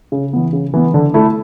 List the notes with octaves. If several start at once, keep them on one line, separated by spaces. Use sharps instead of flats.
C#3
E3 B3
C#3
E3 B3
D3
A3 E4